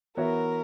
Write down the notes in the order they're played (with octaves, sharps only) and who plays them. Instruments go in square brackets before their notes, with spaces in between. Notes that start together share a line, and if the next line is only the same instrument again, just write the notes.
[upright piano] E3 B3 F#4 C#5 E5 [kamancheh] A#4